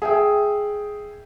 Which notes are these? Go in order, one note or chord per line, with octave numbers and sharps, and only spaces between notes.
G#4 E5 G5